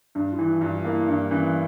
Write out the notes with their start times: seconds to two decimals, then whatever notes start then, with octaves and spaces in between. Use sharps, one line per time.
0.15 G2 D4
0.33 F4
0.38 E3 E4
0.55 E4
0.61 G2 F4
0.74 F4
0.85 A#3 E4
1.08 G2 D4
1.31 E3 C#4